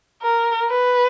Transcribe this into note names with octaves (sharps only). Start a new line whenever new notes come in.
A#4
B4